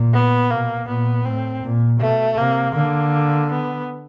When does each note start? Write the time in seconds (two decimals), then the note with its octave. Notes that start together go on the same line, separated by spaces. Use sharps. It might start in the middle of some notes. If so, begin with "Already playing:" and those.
Already playing: A#2
0.14 B3
0.50 B2 A#3
0.88 A#2 B3
1.25 A2 C4
1.63 A#2
2.00 B2 A3
2.37 C3 A#3
2.75 D3 A#3
3.49 B3